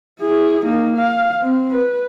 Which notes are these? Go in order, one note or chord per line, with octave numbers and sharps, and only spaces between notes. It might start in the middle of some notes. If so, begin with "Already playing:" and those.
E4 G#4
A#3 D#4
F5
C4
B4